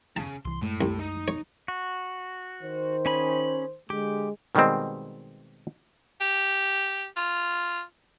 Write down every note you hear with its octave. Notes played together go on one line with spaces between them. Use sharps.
C#3 A5
C2 E3 C6
F#2 A2 G#3 A3
C2
D#4
C#5
F#4
D#3 C5
C#4 G#4 B5
D3 G#3 G4
B2 D#3 G3 G#3 C4
G4
F4